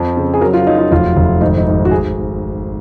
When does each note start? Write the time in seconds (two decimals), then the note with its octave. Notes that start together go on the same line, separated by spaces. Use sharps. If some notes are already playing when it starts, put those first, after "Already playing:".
Already playing: F2 F3
0.17 C#3
0.34 G#4
0.41 F#3 A#4
0.54 F4
0.66 F#3 D#4
0.78 F4
0.91 F1 F4
1.16 F1
1.41 G#1 D#4
1.57 D#4
1.67 G#1
1.85 F#4
1.91 G#4